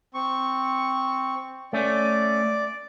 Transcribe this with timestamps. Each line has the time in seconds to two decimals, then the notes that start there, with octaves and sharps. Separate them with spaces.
0.14 C4 C#6
1.73 A3 C#4 D5